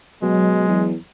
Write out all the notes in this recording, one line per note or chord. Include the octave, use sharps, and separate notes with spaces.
B2 F#3 G#3
E2